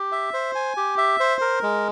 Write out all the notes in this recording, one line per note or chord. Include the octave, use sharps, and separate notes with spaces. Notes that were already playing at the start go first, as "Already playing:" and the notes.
Already playing: G4
E5
C5
G#5
G4
E5
C5
A#4
G#3